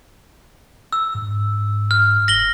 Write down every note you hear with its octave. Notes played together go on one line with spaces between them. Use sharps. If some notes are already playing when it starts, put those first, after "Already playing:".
E6
G#2
F6
F#1 A#6 F#7 G7